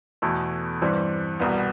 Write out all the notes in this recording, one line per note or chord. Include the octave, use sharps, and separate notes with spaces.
E2 B2 A3 E4 A4
G2 E3 G3 C4
C2 B2 G3 B3